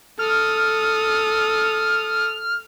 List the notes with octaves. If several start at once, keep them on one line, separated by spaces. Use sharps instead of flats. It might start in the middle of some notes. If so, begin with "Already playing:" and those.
A4 D#6 F6